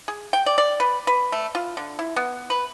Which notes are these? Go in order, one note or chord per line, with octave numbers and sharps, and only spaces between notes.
G#4
G5
D5
D5
B4
B4
A3
F4
D3
E4
B3
B4